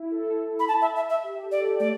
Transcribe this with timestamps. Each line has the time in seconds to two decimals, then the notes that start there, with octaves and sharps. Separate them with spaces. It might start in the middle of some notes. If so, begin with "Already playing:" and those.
Already playing: E4
0.11 A4
0.60 B5
0.68 A5
0.82 E5
0.96 E5
1.10 E5
1.24 G4
1.43 A4
1.52 D5
1.61 G4
1.80 A3 D5